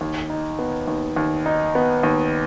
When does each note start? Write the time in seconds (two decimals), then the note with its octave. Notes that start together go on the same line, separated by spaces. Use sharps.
0.01 D#2
0.30 D#4
0.59 B3
0.88 D#2
1.16 D#2
1.46 D#4
1.75 B3
2.03 D#2